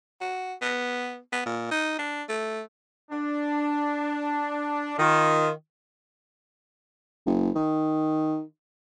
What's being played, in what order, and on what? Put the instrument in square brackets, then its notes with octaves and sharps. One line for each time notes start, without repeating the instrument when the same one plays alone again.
[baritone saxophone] F#4
B3
B3
A#2
D#4
D4
A3
[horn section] D4
D#3 F4
[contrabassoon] F#1
D#3